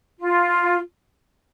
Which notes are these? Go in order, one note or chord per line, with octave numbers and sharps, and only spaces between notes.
F4